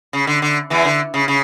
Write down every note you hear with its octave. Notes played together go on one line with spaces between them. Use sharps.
C#3
D3
D3
E2 E3
D3
C#3
C#3